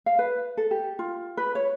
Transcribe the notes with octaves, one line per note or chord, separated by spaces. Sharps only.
F5
B4
A4
G4
F4
B4
C#5